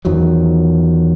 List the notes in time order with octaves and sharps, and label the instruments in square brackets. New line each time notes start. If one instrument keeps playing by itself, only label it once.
[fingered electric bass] E2 D#3 F3 F#3